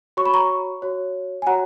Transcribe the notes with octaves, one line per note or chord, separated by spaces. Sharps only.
F#4 C#5 C#6
B5
A#5 C#6
F#4 C#5
G#5
F#4 C#5 F#5 A#5